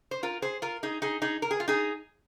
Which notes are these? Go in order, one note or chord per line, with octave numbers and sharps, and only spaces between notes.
C5
F4 A#4
G#4 C5
F4 A#4
D#4 G#4
D#4 G#4
D#4 G#4
A#4
G#4
F4
D#4 G#4